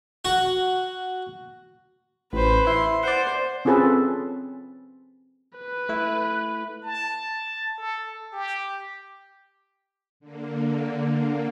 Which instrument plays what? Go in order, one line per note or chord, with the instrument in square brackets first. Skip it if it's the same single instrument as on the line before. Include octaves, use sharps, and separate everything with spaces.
[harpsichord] F#4
[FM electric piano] A1 [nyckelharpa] B4 C5
[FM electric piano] E4 [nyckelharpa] C6
[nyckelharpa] C5 [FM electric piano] D5 F#5
[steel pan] C4 C#4 F4 G#4 A4 B4
[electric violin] B4
[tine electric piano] A3 E4
[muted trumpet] A5
A4
G4
[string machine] D3 A#3